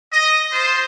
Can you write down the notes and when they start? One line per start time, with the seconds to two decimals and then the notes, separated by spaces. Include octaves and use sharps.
0.11 D#5
0.51 F4 C5